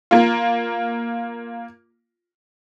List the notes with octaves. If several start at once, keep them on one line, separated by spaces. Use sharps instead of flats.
A#3 F4